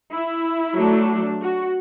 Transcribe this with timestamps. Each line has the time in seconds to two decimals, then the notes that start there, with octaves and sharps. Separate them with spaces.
0.12 E4
0.76 F#3 A3 D4
1.41 F#4